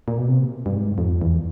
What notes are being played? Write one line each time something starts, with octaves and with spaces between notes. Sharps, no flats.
A#2
B2
C3
G2
G#2
F2
E2